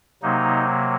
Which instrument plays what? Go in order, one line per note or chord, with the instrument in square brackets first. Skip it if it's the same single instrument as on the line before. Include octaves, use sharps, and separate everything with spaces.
[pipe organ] C3 F#3 A#3 D#4